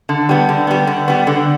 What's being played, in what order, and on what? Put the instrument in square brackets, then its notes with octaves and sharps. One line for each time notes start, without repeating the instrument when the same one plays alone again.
[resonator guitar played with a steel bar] D3
G3 B3
D3
G3 B3
D3
G3 B3
D3